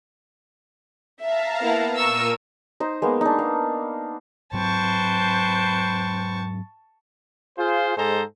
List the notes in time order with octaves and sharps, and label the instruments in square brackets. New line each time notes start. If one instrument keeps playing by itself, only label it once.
[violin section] E5 [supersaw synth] F5 A5 A#5
[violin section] A#3 B3 E4
[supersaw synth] A#2 A#4 D#7 [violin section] C#6 E6
[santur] D#4 C5
G#3 A#3 B3
D4 D#4
F5
[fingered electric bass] G#2 F#3 C4 [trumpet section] B4 C5 G5 [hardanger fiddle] A5 C#6
[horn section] F4 G#4 C5
G#2 G#3 G#4 A4 C5 A#5